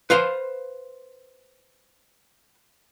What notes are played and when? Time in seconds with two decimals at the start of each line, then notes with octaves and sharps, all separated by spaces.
0.10 B4 C5 F5 C6